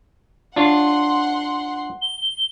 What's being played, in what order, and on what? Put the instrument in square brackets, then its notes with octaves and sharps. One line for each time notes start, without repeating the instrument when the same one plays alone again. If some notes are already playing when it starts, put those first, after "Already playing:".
[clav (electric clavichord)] D4 F4 C#5 [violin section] F#5 C6
[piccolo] G7